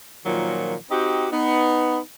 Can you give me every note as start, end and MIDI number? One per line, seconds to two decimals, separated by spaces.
0.25 0.75 46
0.25 0.75 51
0.25 0.75 53
0.25 0.75 54
0.90 1.26 60
0.90 1.26 63
0.90 1.26 66
0.90 1.26 67
1.32 1.99 59
1.32 1.99 63